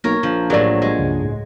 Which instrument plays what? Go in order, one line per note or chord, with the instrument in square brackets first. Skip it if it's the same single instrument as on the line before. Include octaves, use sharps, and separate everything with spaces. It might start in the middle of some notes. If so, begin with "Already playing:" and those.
[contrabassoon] B1 [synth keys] A#3 [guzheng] A#4 C#5
[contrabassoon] A#1 [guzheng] F3
[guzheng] A2 F#3 [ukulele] G4 D5 [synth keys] G#4 A#4 C5
[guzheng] G#3
[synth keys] C#2 G2 C#3
A2